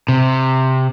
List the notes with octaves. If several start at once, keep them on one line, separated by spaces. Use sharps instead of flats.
C3